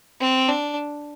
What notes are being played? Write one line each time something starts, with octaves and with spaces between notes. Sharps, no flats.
C4
D4